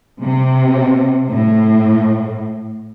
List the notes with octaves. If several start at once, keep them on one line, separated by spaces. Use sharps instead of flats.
C3
A2